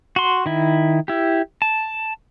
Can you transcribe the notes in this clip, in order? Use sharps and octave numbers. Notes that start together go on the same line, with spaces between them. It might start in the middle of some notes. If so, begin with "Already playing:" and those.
F#4 C6
D#3 E4
E4 G4
A5